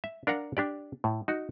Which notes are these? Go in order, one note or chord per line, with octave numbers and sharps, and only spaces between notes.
E5
D4 A#4 F5 F#5 A#5
D4 G4 D5
A2
D#4 F#4